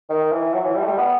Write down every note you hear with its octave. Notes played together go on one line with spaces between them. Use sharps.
D#3
E3
F#3
E3
G3
A3
G3
B3